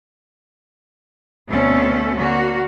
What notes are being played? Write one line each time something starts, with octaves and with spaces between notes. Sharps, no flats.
D2 B2 A3 C4 C#4 A4
D3 A#3 F#4